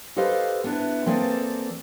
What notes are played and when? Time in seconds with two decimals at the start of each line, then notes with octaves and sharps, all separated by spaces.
0.16 G4 A4 B4 C5 D#5 F5
0.64 B3 D4 E4
1.06 E3 A#3 C4 G#4 A4 D5